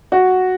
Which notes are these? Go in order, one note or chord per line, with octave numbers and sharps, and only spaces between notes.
F#4